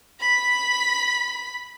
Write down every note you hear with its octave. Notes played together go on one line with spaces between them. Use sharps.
B5 B6